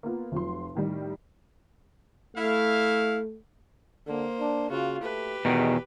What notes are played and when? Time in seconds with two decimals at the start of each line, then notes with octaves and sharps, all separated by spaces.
0.03 A#3 B3 F4
0.32 F1 F3 F#3 C6
0.75 A2 D#3 G3
2.36 A3 E4 F5
4.07 D3 A#3 C5
4.40 D4
4.70 C#3 F4 F#4
5.02 A3 G4 B4
5.45 E2 B2 D#3 G#3